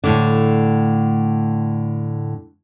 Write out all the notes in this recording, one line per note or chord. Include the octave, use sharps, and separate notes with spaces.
A2 D3